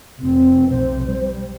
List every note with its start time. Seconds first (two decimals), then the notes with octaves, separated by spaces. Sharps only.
0.21 F1 C4
0.70 B1 C3 C5
1.05 G3